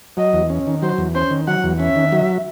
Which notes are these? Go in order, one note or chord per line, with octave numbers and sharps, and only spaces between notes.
F#3 D#5
E2
C#4
D#3
F#3 C5
E2
C#4 C5
D#3
F#3 F#5
E2
C#4 E5
D#3
F#3